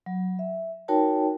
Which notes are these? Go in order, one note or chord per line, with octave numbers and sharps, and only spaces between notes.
F#3
E5
D#4 F#4 A#4 C#5 G5 A5